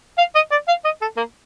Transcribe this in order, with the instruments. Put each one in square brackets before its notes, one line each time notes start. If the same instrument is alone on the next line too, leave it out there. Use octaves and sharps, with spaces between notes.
[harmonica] F5
D#5
D5
F5
D#5
A4
A#3